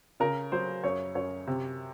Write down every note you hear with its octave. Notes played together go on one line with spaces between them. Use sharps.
C#3 A#4
F#3 C5
F#2 C#5
F#2 C#5
C3